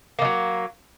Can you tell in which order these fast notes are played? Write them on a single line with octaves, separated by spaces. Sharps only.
A#3 D#3 F#3